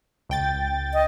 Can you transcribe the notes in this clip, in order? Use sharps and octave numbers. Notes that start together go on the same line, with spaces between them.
C#2 G5 A6
D#5